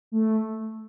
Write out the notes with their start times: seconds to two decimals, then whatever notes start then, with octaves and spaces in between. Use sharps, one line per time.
0.12 A3